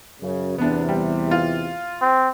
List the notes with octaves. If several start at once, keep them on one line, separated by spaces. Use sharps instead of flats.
F#2 C#3
E2 C3 B3 D4
G3
F4
C4